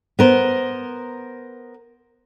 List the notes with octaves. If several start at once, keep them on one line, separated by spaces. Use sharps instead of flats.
B3 A#4 C5